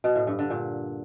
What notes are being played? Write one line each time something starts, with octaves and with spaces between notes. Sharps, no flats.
B2
A2
G2
D3
A#2